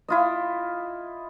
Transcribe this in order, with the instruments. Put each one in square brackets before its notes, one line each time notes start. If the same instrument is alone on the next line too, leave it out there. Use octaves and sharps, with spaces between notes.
[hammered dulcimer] E4 F4 D#5